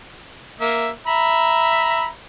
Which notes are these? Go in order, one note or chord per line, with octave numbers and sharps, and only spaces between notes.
A#3 E5
E5 A#5 B5